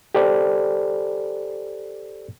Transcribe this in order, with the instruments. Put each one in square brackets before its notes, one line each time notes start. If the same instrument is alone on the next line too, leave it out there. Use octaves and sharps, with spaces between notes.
[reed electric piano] G4 A4 C5 D5